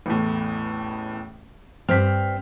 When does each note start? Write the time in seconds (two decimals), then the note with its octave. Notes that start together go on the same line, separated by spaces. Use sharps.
0.06 A1 E2 A2
1.89 G2 C4 F6 B6